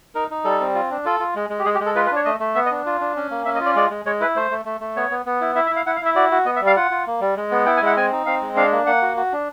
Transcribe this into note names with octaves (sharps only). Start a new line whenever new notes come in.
D#4 A#4
D#4
G3 A4
C4
F4
D4
F4 A4
F4
G#3
G#3
G4
G#3 G#4
G4
G#3
A4
F4 B4
B4
D4
C#5
A3 D#5
A3
B3 E5
D#5
D4
F4
D4
C#4
A#3
C#4 E5
D#5
F4
D5
G#3 D5
G#3
G#3 C#5
E4 B4
A3 C5
A3
A3
A3
B3 C#5
B3
B3
E4
E4 E5
E5
E4
F5
E4 F#5
F5
E4 E5
F#4 D5
F#4
B3 D#5
E5
G3
F5
F4 F#5
F4
A#3
G3
G#3
B3
E4 G5
G#5
G#3 F#5
C4 G#5
D#4
C4 F5
G#3
D4 F5
A#3
A#3 F#5
F#4
F#4
D4